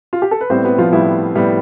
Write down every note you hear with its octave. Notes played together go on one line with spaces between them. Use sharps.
F4
G4
A4
B4
A2 G3 B3 C4 C5
B3 B4
F3 F4
A2 G3 B3 E4
A2 G3 B3